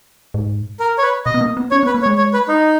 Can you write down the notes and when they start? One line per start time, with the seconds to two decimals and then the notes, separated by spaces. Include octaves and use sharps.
0.34 G#2
0.80 A#4
0.98 C#5
1.03 B4
1.26 B2 D#5
1.34 B3
1.41 A#3
1.57 B3
1.71 C#4 C#5
1.83 B3
1.86 B4
1.95 A#3
2.02 C#5
2.06 G#3
2.18 C#5
2.33 B4
2.48 D#4